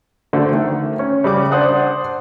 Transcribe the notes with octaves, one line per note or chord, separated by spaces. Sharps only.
D3 A3 F#4 C5
D#3 A3
C#4
C#3 G3 D6
D4 C5 F#5 D#6 F#6